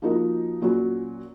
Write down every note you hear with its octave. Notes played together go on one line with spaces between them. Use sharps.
F3 A#3 D#4 F#4 A#4
A#2 F#3 C#4 F#4